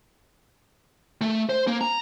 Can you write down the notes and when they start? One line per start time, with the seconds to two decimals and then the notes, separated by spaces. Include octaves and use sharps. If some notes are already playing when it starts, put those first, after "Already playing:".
1.21 A3
1.49 C5
1.67 A#3
1.81 A#5